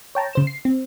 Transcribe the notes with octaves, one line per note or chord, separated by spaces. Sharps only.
C#5 G5 A5 A#5
C#3 C5 E7
C7
C4